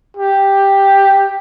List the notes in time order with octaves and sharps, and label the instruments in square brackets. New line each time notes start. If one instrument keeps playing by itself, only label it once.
[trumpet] G4